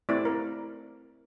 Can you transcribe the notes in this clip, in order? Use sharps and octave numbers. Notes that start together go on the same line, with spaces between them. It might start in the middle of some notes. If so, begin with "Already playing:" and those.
A3 C4 E4 D5
A#4